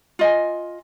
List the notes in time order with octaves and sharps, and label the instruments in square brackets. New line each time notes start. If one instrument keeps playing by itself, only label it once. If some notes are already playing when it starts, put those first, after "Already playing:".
[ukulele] F4 D#5 G#5